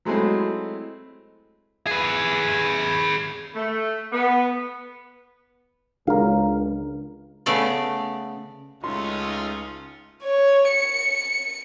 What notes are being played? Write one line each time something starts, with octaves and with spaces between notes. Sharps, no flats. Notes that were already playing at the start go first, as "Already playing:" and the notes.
F#3 G#3 A3 C4 E4
G#4 B4
A3
B3
C#2 D4 A#4 F5
C#3 A3 B3 D5
C#2 A3 C#4 D#4 F4 C6
C#5
C#7